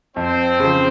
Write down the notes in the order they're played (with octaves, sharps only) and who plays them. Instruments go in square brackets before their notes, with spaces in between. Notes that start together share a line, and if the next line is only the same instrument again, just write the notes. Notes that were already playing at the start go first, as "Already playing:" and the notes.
[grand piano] F2 [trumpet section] C4 C5
[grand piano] C#3 F3